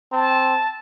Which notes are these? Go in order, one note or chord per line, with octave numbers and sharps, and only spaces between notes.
C4 A5